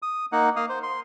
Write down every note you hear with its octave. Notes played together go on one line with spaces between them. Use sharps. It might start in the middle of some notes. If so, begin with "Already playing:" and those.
D#6
A#3 D#4 F#5
A#3 F5 D#6
C5
C6